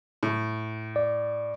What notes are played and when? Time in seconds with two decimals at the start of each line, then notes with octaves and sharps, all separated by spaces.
0.23 A2
0.96 D5